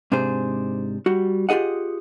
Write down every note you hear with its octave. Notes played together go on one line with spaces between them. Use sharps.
G#2 C3 D4 G#4 C5
G3 F#4
F4 G4 G#4 D#5 F#5